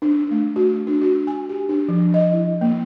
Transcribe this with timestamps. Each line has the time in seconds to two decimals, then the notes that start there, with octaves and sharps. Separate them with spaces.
0.02 D4
0.31 A3
0.56 F#4
0.87 D4
1.02 F#4
1.27 G#5
1.49 G4
1.69 D4
1.88 F3
2.14 D#5
2.33 E4
2.61 A#3